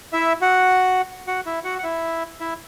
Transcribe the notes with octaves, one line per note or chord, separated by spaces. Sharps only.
E4 E5
F#4 F#5
F#4 F#5
E4 E5
F#4 F#5
F#5
E4 E5
E4 E5